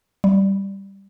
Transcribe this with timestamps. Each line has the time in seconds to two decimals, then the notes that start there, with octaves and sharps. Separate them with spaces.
0.24 G3